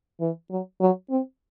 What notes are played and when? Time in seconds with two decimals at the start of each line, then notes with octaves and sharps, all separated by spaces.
0.21 E3
0.51 F#3
0.81 F#3
1.10 C4